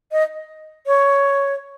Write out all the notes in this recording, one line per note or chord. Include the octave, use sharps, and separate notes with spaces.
D#5
C#5